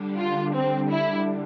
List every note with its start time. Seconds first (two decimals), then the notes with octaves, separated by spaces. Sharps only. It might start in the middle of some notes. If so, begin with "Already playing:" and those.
Already playing: D3 G3 D4
0.18 F4
0.54 C4
0.90 E4